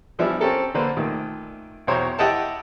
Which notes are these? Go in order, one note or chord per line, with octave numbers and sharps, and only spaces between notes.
E3 F3 G3 B3 D4 E4
C4 C#4 G4 A4 A#4
D3 A#3 D4 B4 C5
A#2 D#3 A3
B1 E2 C5 C#5 G5 A#5
E4 G4 D#5 F#5 G5 A5